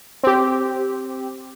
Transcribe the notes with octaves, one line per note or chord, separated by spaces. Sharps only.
C4 G4